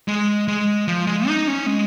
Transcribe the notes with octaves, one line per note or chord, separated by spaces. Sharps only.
G#3
G#3
F3
G#3
D#4
C#4
G#3